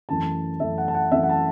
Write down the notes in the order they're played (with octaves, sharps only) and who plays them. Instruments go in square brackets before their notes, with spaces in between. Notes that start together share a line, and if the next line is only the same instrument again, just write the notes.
[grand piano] F#2 E3 A3 A5
F#2 E3 A3 E5
F#5
A5
F#5
F#2 E3 A3 E5
F#5
A5